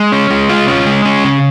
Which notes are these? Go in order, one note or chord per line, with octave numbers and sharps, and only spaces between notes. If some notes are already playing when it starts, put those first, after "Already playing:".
Already playing: G#3
C#4
G#3
F4
C#4
G#3
C#4
C#3